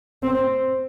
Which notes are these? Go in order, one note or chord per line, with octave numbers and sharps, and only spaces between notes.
C4